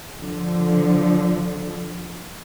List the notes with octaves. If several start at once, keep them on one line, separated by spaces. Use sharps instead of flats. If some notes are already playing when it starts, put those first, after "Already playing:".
D3 F3